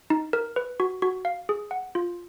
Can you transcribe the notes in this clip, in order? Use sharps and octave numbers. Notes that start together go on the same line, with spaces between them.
D#4
A#4
B4
F#4
F#4
F5
G#4
F#5
F4